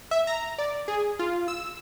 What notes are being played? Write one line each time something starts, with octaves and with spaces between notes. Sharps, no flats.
E5
A#5
D5
G#4
F4
E6